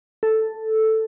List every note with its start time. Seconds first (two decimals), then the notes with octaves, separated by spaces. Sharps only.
0.23 A4